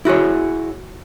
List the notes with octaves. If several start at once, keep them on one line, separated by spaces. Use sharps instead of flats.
E4 F#4 G#4 C#5